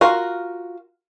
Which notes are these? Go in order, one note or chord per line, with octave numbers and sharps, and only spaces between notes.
F4 F#4 A#4 F5